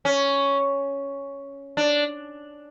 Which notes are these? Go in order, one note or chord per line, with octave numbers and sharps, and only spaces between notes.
C#4
D4